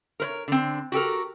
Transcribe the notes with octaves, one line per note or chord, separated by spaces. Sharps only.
A#4 B4 C#5
D3 C4
F#4 G4 A4 A#4